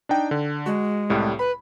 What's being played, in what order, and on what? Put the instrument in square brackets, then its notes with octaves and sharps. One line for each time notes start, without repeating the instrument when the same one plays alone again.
[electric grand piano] D4 D#4 G5
D3
[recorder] G#3 [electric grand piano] F#4
[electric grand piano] C2 A2 G3
[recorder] B4 [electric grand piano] B5